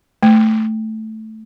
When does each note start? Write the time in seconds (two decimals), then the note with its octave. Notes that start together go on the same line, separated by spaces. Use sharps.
0.23 A3